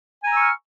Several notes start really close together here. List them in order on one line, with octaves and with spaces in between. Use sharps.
G#5 A#5 E6 C#6 F6